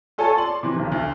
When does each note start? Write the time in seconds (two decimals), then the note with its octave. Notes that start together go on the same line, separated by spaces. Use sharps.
0.18 F4 A4 C#5 G#5 A5
0.37 D5 C6 F#7
0.63 C3 E3
0.76 B1 D#3
0.92 D2